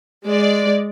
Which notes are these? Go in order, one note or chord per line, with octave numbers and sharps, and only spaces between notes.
G#3 D5